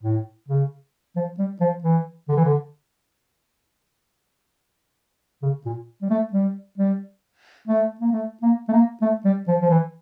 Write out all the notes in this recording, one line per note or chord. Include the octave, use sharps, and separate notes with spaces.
A2
C#3
F3
G3
F3
E3
D3
E3
D3
C#3
A#2
G3
A3
G3
G3
A3
A#3
A3
A#3
A3
A#3
A3
G3
F3
F3
E3